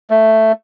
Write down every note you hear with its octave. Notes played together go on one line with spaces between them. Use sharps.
A3